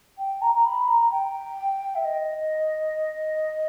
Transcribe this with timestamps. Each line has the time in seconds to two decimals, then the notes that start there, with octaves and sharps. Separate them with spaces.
0.18 G5
0.41 A#5
0.54 A#5
0.65 B5
0.88 A#5
1.11 G5
1.95 E5
2.04 D#5